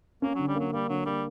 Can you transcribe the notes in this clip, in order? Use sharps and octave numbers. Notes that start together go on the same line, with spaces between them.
A#3 C#4
D3 F#3
G3
F#3 A#3
G3 A#3
D3 F#3
G3 A#3